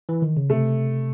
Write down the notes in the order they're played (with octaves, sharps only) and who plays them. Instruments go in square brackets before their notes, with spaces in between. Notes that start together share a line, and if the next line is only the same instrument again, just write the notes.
[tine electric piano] E3
D#3
C#3
[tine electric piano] C3 [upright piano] A3